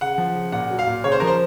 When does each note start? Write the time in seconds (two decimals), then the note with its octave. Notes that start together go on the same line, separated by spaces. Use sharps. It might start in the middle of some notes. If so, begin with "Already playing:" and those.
0.01 C#3 F#5
0.18 F3
0.35 C#3
0.52 A#2 F#5
0.70 F#3
0.79 F5
0.87 A#2
1.04 C#3 C#5
1.12 C5
1.20 F3 A#4
1.27 C5